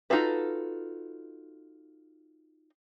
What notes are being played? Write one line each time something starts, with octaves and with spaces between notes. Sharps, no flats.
D#4 F4 F#4 A4 B4